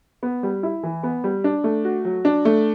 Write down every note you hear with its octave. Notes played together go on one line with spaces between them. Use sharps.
B3
G3
E4
E3
B3
G3
D4
A3
F#4
F#3
D4
A3